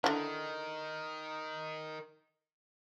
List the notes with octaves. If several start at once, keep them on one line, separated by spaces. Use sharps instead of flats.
D3 D#3 D#4 E4